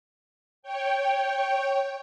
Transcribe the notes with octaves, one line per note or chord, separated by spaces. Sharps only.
C#5 G5